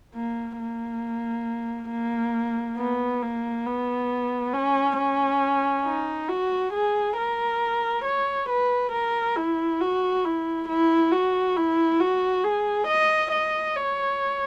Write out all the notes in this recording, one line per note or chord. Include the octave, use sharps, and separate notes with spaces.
A#3
A#3
A#3
B3
A#3
B3
C#4
C#4
D#4
F#4
G#4
A#4
C#5
B4
A#4
E4
F#4
E4
E4
F#4
E4
F#4
G#4
D#5
D#5
C#5